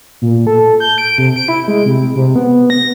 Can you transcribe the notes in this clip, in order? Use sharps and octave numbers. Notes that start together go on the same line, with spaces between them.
A#2
A4
G6
D7
C3
D7
E4
G#3
C3
C3
B3
A#6